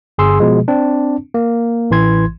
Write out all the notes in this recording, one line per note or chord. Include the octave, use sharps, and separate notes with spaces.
G1 G#4 C6 E6
B2 F3 G#3
C4 D4
A#3
A1 E3 C6 G#6